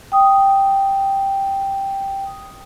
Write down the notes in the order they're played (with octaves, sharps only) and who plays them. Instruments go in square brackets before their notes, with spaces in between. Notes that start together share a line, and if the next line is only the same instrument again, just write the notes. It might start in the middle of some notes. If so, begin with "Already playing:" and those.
[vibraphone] G5 D#6